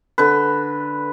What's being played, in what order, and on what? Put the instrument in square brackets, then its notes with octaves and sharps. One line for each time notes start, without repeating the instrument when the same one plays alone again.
[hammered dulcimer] D3 B4